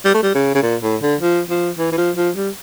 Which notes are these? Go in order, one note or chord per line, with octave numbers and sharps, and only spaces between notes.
G3
A3
G3
C#3
C#3
A#2
A2
D3
F3
F3
E3
E3
F3
F3
G3